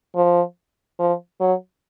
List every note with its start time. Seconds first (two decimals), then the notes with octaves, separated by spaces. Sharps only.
0.16 F3
0.99 F3
1.40 F#3